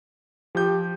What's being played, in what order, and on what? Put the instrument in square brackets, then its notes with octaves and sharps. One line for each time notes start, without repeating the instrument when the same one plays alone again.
[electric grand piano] F3 G6 [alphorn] G4